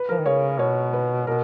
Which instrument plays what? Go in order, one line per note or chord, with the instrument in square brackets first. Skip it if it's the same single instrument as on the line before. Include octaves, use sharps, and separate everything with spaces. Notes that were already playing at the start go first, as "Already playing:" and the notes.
Already playing: [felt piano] B4
[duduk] F3 [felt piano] A#4
[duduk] D#3
[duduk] C#3 [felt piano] C#5
[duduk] B2 [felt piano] C#5
[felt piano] B4
[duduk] B2 [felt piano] A#4